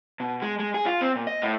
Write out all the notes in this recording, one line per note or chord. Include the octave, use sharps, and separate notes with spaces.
B2
G#3
G#3
G#4
F4
C4
A#2
D#5
A2